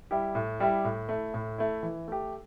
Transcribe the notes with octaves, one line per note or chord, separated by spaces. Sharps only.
G3 E4 G4
A2
G3 E4 G4
A2
A3 E4
A2
A3 E4
E3
A3 G4